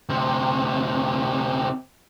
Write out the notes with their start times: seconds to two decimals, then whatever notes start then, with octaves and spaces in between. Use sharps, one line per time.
0.09 D2 C3